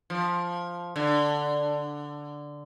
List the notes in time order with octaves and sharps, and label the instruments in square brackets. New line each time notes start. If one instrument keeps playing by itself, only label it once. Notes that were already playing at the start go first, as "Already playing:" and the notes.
[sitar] F3
D3